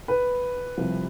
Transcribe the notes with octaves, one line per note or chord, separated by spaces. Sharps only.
B4
C2 C3 F3